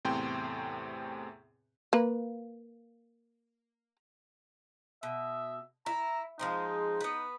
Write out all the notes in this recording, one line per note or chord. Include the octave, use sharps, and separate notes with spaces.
E2 A2 C3 C4 G5 C6
A#3 B4
B2 E5
E4 A#5
F3 G#3 C4 D#4
B3 B4